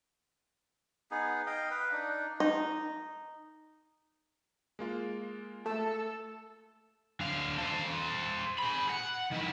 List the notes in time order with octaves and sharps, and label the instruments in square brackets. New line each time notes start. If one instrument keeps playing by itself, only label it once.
[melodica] B3 D#4 G#4
D#5 F5 G5
B4 F5
D4 D#4
[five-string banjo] D#4
[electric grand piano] G#3 A#3 F4
[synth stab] A3 [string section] A4 [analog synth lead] E6
[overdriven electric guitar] D3 F5
A4 C5
G#4 B5
F#5
D#3 E4